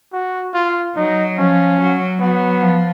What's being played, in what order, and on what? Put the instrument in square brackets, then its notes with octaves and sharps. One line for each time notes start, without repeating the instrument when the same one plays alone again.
[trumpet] F#4
F4
[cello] F#3 [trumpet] D#4
[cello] F3 [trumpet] C#4
[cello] F#3
[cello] F#3 [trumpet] B3
[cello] F3